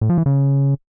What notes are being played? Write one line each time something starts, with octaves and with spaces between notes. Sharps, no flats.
A2
F3
E3
C#3